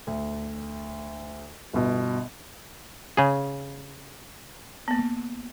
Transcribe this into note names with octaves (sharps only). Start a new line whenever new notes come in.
D2
G1 B2
C#3 G#4
A#3 B3